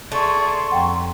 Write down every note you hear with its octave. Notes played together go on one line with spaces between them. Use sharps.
A3 G#4 D5 C6 C#6
F2 F#5 G5 A#5